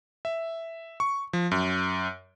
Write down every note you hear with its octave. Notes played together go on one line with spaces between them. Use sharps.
E5
C#6
F3
F#2